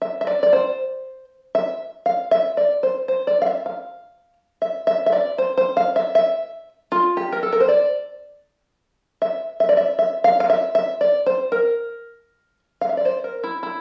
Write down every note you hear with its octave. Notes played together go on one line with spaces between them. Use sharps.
E5
E5
D5
D5
C5
E5
F5
E5
D5
C5
C5
D5
F5
E5
F5
E5
E5
E5
D5
C5
C5
F5
E5
E5
F4
G4
A#4
A4
A#4
C5
D5
E5
E5
D5
E5
E5
F5
F5
E5
E5
D5
C5
A#4
F5
E5
D5
C5
A#4
E4
E4